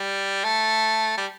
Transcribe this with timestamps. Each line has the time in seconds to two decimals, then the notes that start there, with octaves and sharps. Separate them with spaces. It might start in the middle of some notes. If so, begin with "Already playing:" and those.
Already playing: G3
0.44 A3
1.18 G3